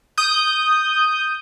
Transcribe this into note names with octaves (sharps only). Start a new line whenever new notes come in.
D#6 G6